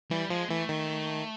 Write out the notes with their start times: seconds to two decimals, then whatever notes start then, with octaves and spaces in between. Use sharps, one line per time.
0.11 E3 G3
0.30 F3 G#3
0.50 E3 A3
0.69 D#3